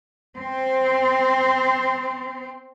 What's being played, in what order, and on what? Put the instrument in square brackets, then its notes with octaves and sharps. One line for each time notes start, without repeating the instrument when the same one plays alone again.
[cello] C4 C5